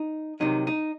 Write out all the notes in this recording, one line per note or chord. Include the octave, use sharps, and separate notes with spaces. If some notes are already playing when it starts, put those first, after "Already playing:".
Already playing: D#4
C2 C3 D#3 F#3 D#4
D#4